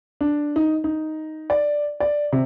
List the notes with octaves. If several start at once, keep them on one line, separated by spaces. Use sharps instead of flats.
D4
D#4
D#4
D5
D5
C3